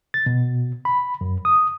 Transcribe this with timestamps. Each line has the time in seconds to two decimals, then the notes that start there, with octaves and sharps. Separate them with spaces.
0.14 A6
0.26 B2
0.85 B5
1.21 F#2
1.45 D#6